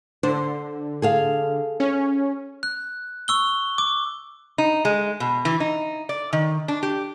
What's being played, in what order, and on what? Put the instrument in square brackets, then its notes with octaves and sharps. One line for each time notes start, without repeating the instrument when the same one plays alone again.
[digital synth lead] D3 [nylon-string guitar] C5
[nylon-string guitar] G#4 A4 F5
[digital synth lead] C#4
[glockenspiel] F#6
C#6 E6 G7
D6
[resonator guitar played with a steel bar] D#4
G#3
B2
E3
D#4
D5
D#3
D4
G4